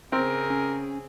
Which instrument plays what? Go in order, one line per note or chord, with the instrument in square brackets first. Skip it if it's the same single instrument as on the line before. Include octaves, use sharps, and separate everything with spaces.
[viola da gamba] C#3 G#4 [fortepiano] C4 [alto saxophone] A#4
[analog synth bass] C#4